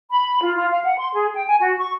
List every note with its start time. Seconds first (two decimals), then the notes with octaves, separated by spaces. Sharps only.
0.10 B5
0.42 F4
0.56 F4
0.71 F5
0.84 F#5
0.99 C6
1.13 G#4
1.34 G5
1.47 G#5
1.60 F#4
1.78 C#6